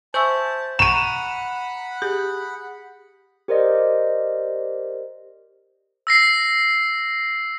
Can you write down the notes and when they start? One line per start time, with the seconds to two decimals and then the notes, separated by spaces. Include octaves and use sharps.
0.14 C5 E5 G#5 A5 C#6 E6
0.79 F#5 A#5 B5 C#6 D#7 E7
2.02 G4 G#4
3.48 G4 A#4 C5 D5 D#5
6.07 E6 A#6 C7